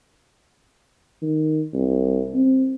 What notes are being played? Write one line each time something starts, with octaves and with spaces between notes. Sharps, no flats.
D#3
C2
C4